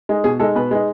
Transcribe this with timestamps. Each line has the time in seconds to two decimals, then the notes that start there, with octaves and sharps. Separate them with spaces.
0.09 G#3 D#4
0.24 B2 G#4
0.40 G#3 D#4 A4
0.56 B2 B4
0.71 G#3 D#4